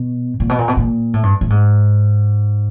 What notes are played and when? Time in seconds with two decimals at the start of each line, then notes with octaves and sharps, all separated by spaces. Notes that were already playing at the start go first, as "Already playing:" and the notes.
Already playing: B2
0.40 A#2
0.49 B2
0.58 A#2
0.68 B2
0.77 A#2
1.14 A2
1.23 G2
1.41 A2
1.50 G#2